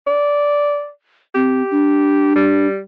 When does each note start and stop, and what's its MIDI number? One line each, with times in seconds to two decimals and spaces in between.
0.07 0.89 74
1.35 1.63 60
1.35 2.36 67
1.71 2.67 62
2.36 2.80 55